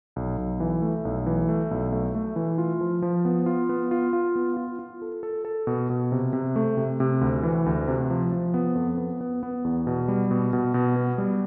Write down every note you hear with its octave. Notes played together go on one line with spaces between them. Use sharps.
B1
B1
E3
A3
B1
E3
A3
B1
A3
A3
E3
F4
F3
F3
B3
F4
B3
F4
F4
B3
F4
F4
A4
A4
A4
B2
B2
C3
C3
A3
C3
C3
D2
E3
D2
C3
F3
F3
B3
F2
B3
B3
B3
E2
B2
G3
B2
B2
B2
B3
G3